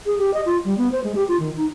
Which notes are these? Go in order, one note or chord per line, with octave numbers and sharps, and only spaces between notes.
G#4
G4
D#5
F4
G3
B3
C5
G#3
G4
F4
D#3
D#4